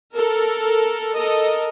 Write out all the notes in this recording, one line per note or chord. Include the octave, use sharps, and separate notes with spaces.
A4 A#4
A4 A#4 D#5